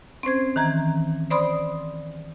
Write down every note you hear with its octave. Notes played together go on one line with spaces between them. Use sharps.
C4 C#4 C5 G#6
D#3 E3 A#5 G#6
C5 D5 B5 C6 D#6